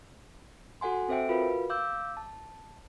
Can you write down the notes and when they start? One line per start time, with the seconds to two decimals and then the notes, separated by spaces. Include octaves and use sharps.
0.81 F#4 A4 F#5 G#5 C6
1.08 C4 A4 C5 E5 G5 D7
1.29 F4 F#4 A#4 B4 F5 B5
1.70 F5 D6 E6 G6
2.17 A5